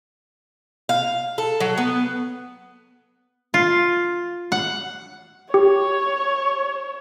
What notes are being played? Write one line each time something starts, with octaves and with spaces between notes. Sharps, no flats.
F5
A4
F#3
B3
F4
F#5
G4 C#5